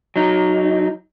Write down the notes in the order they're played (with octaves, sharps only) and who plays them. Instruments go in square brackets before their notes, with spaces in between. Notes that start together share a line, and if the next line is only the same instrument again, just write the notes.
[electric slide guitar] F#3 D#4